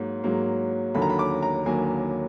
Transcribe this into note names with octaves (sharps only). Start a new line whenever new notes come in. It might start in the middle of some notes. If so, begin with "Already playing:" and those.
Already playing: G#2 F#3 A#3
G#2 F#3 A#3
D#2 D3 F#3 A#3 B5
A#5
B5
D6
A#5
D#2 D3 F#3 A#3 G#5